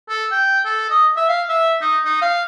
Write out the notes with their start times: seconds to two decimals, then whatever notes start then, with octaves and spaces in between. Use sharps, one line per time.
0.09 A4
0.32 G5
0.65 A4
0.90 D#5
1.17 E5
1.29 F5
1.49 E5
1.81 D#4
2.05 D#4
2.22 F5